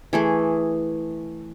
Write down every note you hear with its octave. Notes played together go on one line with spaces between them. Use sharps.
E3 A3 G#4